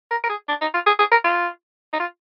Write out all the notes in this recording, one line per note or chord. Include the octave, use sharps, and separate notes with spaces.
A#4
A#4
G#4
D4
D#4
F4
G#4
G#4
A#4
F4
D#4
F4